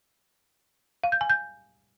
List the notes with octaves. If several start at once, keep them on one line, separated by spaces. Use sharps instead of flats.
F5
G6
G#5
G6